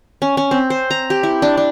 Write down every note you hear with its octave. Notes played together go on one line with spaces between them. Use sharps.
C#4
C#4
C4
C5
A#5
G4
E4
D4
D4